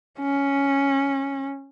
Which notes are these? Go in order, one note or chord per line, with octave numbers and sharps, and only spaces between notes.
C#4